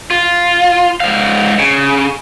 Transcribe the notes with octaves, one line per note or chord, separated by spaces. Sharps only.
F4
G#2 F5
C#3